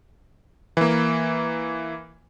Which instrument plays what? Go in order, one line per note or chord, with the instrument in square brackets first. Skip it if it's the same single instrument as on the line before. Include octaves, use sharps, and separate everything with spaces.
[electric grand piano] E3 A#3